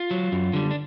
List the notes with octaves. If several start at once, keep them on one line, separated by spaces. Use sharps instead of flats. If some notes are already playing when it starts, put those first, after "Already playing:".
Already playing: F4
F#3
F#2
D3 G3
D4